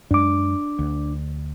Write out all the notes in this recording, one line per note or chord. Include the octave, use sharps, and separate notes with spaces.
F#2 G#3 D4 D6
D2